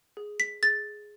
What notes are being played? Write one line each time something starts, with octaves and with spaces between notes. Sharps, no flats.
G#4
B6
G#4 A6